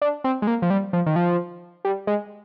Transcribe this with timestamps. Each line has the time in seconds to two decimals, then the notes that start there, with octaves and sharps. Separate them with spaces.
0.02 D4
0.24 C4
0.42 G#3
0.47 A#3
0.62 F3
0.70 G3
0.93 F3
1.06 D#3
1.16 F3
1.85 G3
2.07 G#3